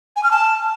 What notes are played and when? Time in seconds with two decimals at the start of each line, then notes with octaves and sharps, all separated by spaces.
0.16 G#5
0.24 F6
0.31 A5